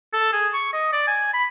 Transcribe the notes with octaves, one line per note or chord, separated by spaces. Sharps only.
A4
G#4
C#6
D#5
D5
G#5
B5